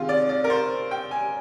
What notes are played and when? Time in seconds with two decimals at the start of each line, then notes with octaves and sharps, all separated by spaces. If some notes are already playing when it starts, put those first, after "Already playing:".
Already playing: C3 D#3 G#3 F4
0.09 D5
0.29 D5
0.44 A#4
0.50 C5
0.91 G5
1.11 G#5